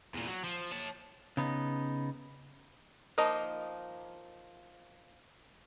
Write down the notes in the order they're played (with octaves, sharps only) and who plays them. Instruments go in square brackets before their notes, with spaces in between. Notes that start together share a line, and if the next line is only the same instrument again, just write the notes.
[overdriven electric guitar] E2 A#2
F#3
F3
C#5 A5
[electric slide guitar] C#3 B3 D#4
[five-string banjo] F3 A#3 D#4 D#5